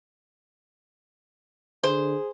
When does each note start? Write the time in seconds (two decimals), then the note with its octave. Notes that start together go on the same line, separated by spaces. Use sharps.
1.84 D3 G#4 C5